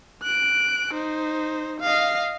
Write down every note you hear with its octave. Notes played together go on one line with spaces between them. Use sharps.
F#6 D7
D#4 C5
D#5 F5